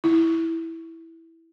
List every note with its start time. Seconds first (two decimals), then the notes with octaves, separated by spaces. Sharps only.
0.04 E4